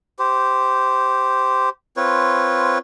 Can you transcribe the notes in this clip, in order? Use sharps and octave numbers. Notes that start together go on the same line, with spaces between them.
G4 C5
C4 F4 B4 C#5